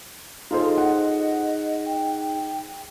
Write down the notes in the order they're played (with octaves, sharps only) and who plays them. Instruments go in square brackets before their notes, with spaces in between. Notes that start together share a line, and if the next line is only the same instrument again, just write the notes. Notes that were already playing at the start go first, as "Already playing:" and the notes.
[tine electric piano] D#4 G#4 [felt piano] F4 A4 C5 [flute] D#5
[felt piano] F#5
[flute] G5